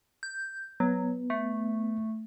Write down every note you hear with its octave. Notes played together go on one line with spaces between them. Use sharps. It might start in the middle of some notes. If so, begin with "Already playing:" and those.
G6
F#3 B3
A3